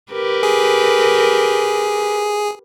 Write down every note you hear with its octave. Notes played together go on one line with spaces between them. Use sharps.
G4 A#4 B4
G#4